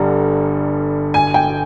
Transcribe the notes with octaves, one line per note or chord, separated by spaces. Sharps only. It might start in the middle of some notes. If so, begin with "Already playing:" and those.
Already playing: G1 G2 D3 G3 A#5
G#5
G5